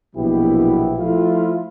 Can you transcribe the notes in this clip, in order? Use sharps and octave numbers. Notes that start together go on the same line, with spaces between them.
A#1 B2 F#3 B3 E4 G4
F3 A3 E4 F4